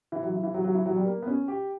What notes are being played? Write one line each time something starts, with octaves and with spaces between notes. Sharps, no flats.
E3
F#3
E3
E3
F#3
F#3
E3
F#3
G3
A#3
B3
C#4
G4